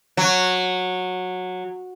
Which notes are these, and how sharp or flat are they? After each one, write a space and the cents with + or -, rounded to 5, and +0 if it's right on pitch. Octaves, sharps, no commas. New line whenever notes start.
F#3 -15